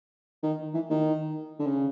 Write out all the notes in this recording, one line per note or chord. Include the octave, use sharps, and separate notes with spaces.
D#3
E3
D#3
D3
C#3